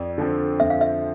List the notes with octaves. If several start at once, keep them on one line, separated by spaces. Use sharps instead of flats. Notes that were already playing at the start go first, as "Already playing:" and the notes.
Already playing: F2 D5
D3 F3 C4
F2 E5
F5
E5